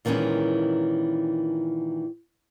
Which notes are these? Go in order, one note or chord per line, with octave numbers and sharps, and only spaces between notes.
A#2 D#3 E3 G#3 C#4